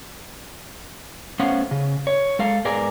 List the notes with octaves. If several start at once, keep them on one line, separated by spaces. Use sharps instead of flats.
A3 B3 C#4 C5 F5 F#5
C#3
C#5
G#3 A4 F5
G#2 B3 G#4 A#4 D5 G#5